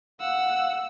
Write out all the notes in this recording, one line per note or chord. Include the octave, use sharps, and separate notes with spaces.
F5 F#5 E6